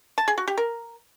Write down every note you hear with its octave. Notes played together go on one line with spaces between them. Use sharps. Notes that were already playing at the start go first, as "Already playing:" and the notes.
A5
G#4
F#4
G4
A#4